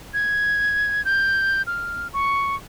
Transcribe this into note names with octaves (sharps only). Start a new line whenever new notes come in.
G#6
G6
F6
C#6